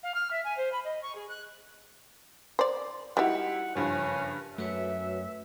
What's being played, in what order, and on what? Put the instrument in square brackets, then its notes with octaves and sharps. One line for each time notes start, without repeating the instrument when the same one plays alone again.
[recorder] F5
F6
E5
G#5
C5
B5
D#5
C#6
G#4
F#6
[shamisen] C5 D5
[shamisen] G3 F#4 [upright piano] D#4 E4 G4 [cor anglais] F#5
[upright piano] F#1 G2 F3 [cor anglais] C#4
[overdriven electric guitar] F#2 [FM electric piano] A3 [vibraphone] F#4 B4 C#5 [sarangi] E5